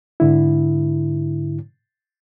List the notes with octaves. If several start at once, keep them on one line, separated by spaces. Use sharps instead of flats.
G#2 D3 E4